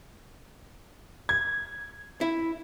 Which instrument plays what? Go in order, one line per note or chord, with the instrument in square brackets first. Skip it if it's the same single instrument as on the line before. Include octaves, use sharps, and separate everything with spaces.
[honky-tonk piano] G#6
[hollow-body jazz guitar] E4